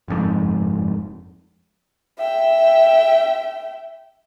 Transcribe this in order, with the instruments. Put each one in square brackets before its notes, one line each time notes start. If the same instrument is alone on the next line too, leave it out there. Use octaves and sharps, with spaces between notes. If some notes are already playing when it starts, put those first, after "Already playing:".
[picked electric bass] F#1 F2 G#2
[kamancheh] E5 G5